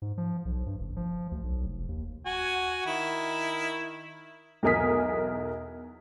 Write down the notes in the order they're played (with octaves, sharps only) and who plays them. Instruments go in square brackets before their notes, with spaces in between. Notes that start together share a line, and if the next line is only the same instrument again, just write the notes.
[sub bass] G#2
F3
B1
G2
F#1
F3
D2
B1
F1
D#2
[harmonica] F#4 G#5
D#3 E4
[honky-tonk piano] B1 E2 A#4 G#5 D#6 B6